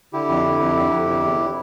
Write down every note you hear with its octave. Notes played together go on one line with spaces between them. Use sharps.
D3 E4 G4
F2
D3
F2
D3
F2
C3
E2